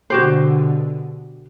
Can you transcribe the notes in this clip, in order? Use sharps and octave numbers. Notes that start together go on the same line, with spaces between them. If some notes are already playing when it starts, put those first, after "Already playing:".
B2 D3 F#4 G4 C5